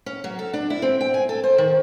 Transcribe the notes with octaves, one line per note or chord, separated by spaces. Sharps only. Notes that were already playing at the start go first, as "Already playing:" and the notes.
C#4
F#3
A4
D4
E4
C4
G5
G#5
A4
C5
D#3